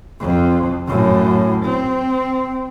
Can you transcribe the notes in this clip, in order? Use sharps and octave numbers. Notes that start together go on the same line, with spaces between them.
F2
F#2 A2
C4